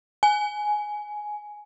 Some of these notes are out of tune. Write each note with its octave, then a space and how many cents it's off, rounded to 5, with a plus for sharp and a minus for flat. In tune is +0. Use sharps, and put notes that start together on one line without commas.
G#5 +10